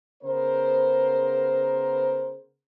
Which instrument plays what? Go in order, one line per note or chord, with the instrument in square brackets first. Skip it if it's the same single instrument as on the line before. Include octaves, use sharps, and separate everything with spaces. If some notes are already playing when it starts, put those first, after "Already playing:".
[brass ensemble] C#3 B3 A#4 C5